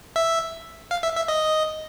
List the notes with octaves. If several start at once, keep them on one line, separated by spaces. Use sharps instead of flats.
E5
F5
E5
E5
D#5